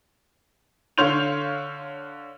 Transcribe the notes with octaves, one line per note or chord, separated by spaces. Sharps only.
D3 C#5 F5 C6 G6 F7